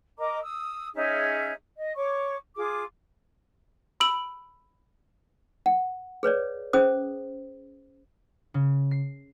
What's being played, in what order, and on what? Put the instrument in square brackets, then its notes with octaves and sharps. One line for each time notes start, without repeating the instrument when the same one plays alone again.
[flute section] A#4 D#5 A#5 D6
D#6 E6
C#4 D#4 G#4 E5
D#5
C#5 C#6 D6
F4 G#4 D6
[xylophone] B5 E6 D7 F#7
[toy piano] F#5
G#4 B4 C#5 D5
C#4 G#4 C5 D#6
[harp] C#3
C7